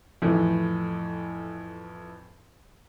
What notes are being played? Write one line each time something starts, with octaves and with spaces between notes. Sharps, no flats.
F2 A2 E3